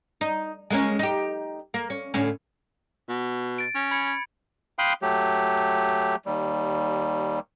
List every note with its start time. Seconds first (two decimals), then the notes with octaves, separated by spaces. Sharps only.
0.21 D#4
0.70 G#3 A#3 C#4
0.99 D#4 G4
1.74 A#3
1.90 C#4
2.14 D2 A2 C#4
3.09 B2
3.58 A6 D7
3.75 C#4
3.91 B5 G#6 C#7
4.79 F5 G5 B5 C6 D#6 F#6
5.02 F#3 A3 G4
6.26 D#2 G3